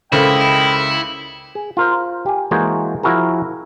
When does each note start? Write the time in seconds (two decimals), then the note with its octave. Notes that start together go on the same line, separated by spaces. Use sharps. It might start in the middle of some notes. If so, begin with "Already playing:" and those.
0.12 C#2 E4 A4 A#4 C5 D#5 G5 B5
1.55 G#4
1.77 F4 A#4 C5
2.26 G4 G#5
2.51 E3 G#3 A#3 F#4 G#4 C5
3.03 F3 E4 F#4 G#4 A#4